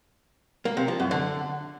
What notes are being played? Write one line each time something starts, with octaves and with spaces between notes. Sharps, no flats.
A#3
C3
F3
F#2
D3